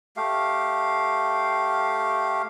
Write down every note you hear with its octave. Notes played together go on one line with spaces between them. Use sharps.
A3 G4 F5